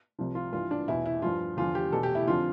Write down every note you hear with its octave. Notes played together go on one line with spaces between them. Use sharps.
C2 C3 F3
F4
G2 E3 F4
D4
E2 B2 E4
E4
G2 F3 F4
E2 D3 F3 F4
G4
E2 B2 A4
G4
E4
F2 D3 F3 F4